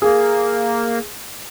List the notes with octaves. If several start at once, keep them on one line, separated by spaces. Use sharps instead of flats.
A#3 G#4